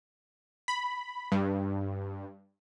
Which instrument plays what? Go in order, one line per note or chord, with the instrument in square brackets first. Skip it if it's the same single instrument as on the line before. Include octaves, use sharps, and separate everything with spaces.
[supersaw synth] B5
G2